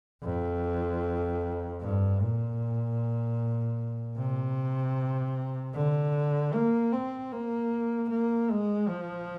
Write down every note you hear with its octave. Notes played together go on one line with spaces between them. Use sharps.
F2
G2
A#2
C3
D3
A#3
C4
A#3
A#3
G#3
F3